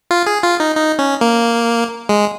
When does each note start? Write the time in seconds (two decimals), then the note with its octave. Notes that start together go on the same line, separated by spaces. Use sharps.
0.11 F4
0.27 G#4
0.43 F4
0.60 D#4
0.76 D#4
0.99 C#4
1.21 A#3
2.09 G#3